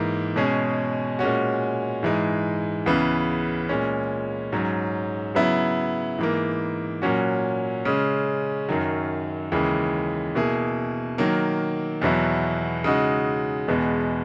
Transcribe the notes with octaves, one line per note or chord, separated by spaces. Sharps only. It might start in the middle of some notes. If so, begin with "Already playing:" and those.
Already playing: G#2 E3 A#3
B2 G#3 C#4 G#4
A#2 G#3 C#4 F#4
G#2 E3 G#3
C#2 C#3 E3 B3
A#2 G#3 C#4
G#2 F#3 C#4
C#3 F#3 B3 E4
G#2 E3 A#3
A#2 F#3 C#4 F#4
C#3 G#3 C#4
F#2 D#3 F#3
D#2 C#3 E3 G#3
B2 A#3 E4 G#4
D#3 F#3 A#3
E2 B2 F#3 B3 E4
C#3 G#3 D#4 F#4
E2 B2 G#3 B3